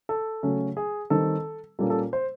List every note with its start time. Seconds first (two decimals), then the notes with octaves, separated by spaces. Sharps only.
0.09 A4
0.43 C#3 F#3 A3 C#4
0.77 G#4
1.10 D#3 G3 C4 A4
1.79 A#2 G3 A#3 C#4 A4
1.90 A4
2.13 C5